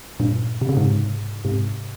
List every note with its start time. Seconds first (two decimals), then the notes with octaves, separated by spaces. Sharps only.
0.20 G2 A#2
0.61 C3
0.69 C#3
0.77 G#2 C3
1.45 G#2 C3